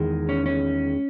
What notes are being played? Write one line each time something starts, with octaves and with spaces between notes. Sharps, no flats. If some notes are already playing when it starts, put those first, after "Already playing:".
Already playing: E2 D#3 G#3
C#4
C#4